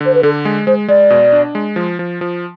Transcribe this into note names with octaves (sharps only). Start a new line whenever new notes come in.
D3
C5
B4
D3 A4
G#3
G#3 C5
G#3 D5
B2
D4
G#3
F3
F3
F3